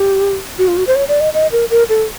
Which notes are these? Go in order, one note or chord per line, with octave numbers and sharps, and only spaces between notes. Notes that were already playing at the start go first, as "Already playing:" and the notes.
Already playing: G4
F#4
F4
F#4
C5
C#5
D5
D#5
D#5
A#4
A#4
A4